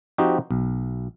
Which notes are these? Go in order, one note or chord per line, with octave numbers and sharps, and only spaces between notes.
F3 C4 D#4 F#4 G4
B1